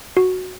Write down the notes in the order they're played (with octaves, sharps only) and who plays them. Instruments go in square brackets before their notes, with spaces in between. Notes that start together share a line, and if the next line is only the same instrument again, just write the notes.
[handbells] F#4